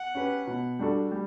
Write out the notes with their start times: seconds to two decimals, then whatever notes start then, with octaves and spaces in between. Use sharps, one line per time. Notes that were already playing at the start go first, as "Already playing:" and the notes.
Already playing: F#5
0.15 C#4 G4 B4
0.47 B2
0.79 G3 D4 F#4 A4
1.11 G3